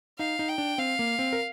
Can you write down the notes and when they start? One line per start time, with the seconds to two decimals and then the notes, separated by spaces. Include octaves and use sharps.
0.19 D#4 F5
0.39 D#4
0.48 G5
0.58 D4
0.78 C4 F5
0.99 A#3
1.19 C4
1.33 A#4